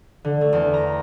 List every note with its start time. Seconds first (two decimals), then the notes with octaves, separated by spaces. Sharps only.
0.25 D3
0.41 A3
0.53 E2
0.74 A#5